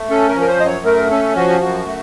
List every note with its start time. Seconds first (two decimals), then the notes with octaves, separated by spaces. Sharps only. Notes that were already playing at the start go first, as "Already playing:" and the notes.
Already playing: A3
0.10 C#4 A4
0.29 A#4
0.35 F3
0.41 A#4
0.48 C5
0.60 F#2 D#5
0.66 C#5
0.85 A3 A#4
1.10 C#4 A4
1.36 F3 F#4
1.61 F#2 F#4
1.86 A3